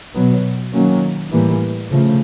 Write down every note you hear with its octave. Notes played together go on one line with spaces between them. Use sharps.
B2 F#3 B3
D#3 F#3 A#3 C#4
A2 E3 G3 A#3
C#3 F3 A3